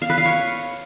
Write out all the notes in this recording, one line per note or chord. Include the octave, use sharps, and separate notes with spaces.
F5
B4
F5
C#5